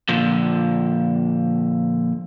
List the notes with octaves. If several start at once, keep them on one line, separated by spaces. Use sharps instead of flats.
A#2 D3 F3